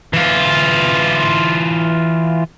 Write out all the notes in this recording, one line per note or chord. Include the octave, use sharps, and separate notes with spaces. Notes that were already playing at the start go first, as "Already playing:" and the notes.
E3 F4